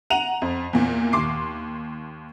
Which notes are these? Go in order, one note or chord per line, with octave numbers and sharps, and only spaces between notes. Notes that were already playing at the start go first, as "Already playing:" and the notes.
F#5 A#5 D#7 F7 F#7
F2
E2 A#2
D#2 C6 D6 C7